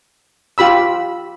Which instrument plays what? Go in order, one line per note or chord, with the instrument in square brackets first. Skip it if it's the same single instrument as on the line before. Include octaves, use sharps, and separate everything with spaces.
[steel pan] F4 G4 B5 E6